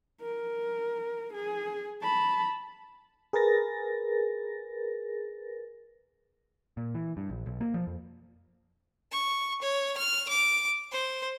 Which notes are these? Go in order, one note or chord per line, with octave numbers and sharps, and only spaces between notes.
A#4
G#4
A5 B5
G#4 A#4 B4 A6 A#6
A#2
E3
G2
A#1
B1
A#3
F3
F2
C#6
C#5
F6
D6
C5